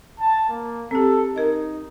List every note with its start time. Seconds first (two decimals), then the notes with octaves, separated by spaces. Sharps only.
0.20 A5
0.50 A#3
0.91 C4 G4 A4
1.36 D#4 A#4 D#5